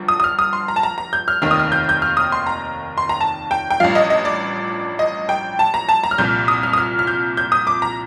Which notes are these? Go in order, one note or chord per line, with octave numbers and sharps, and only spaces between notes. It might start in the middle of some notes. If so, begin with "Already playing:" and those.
Already playing: G1 G2 F3
D#6
D#6
F6
D#6
C6
A#5
A5
A#5
A#5
G6
F6
F1 D#2 D#3 F6
D#6
F6
G6
G6
F6
D#6
C6
A#5
C6
A#5
A5
G5
G5
A1 G2 F3 F5
D#5
D#5
D5
D#5
G5
A5
A#5
A5
A#5
F6
C2 A#2 F3 G6
D#6
F6
D#6
F6
F6
G6
G6
D#6
D6
A#5